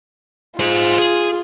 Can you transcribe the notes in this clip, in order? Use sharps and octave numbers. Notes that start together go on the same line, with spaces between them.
F4 G#4 C5
G#4